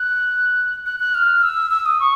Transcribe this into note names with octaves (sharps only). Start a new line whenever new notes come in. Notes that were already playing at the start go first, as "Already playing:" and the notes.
Already playing: F#6
F#6
F#6
F6
E6
E6
D#6
C#6